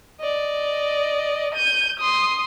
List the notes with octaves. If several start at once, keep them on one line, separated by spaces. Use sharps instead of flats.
D5 D#5
G6 D#7
C6 D#6